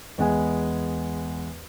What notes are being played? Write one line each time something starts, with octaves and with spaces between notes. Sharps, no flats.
E2 G#3 B3 G#5